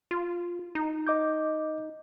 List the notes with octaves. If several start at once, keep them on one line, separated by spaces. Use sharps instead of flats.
F4
D#4
D#5 D6 G6